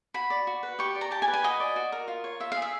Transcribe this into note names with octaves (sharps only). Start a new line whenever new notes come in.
F#4 B5
D5
F#4
B4
G4 C#6
D5
A#5
G4 A5
G#5
B4
G#5
F#4 D#5
D5
F#4
A#4
F4
C#5
F4 E5
G#4 F5
E5